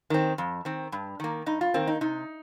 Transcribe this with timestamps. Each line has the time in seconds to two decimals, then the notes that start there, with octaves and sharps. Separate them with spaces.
0.10 D#3 C4
0.38 F2
0.65 D#3 C4
0.92 G2
1.20 D#3 A#3
1.46 G2 D#4
1.61 F4
1.74 D#3 A#3 C4
1.87 D#4
2.01 C3 D#4